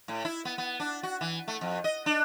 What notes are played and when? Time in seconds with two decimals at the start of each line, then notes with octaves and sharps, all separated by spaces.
0.08 A2
0.25 E4
0.45 B3
0.58 B3
0.80 D4
1.03 F#4
1.21 E3
1.48 A3
1.61 F2
1.84 D#5
2.06 D4